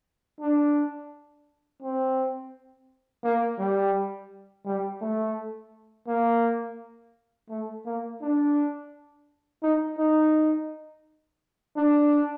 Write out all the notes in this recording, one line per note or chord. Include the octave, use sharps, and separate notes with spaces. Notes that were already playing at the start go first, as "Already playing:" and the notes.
D4
C4
A#3
G3
G3
A3
A#3
A3
A#3
D4
D#4
D#4
D4